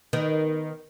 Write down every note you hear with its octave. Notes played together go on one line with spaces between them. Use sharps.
D#3 B3